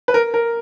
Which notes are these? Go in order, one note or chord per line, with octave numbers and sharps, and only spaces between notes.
B4
A#4
A#4